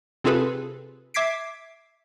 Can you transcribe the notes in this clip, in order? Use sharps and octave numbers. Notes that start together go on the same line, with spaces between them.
C3 C4 F4 G#4 A4 B4
E5 D6 G#6 B6 C7 D7